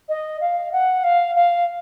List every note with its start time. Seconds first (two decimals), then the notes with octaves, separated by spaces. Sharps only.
0.08 D#5
0.40 F5
0.72 F#5
1.03 F5
1.35 F5